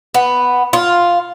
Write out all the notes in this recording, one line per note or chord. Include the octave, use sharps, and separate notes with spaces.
B3
F4